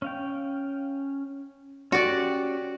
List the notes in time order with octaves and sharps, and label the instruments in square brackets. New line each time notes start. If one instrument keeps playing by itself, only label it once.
[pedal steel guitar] C#4 F5 G5
[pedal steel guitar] C#4 G4 [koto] F#4 D5